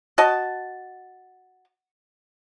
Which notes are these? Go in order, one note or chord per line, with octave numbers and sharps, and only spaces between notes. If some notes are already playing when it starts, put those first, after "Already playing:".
F#4 D#5 A5